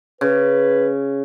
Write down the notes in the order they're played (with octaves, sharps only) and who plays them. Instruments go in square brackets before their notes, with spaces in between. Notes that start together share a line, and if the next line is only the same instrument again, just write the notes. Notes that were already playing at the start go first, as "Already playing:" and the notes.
[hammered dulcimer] C#3 [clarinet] B4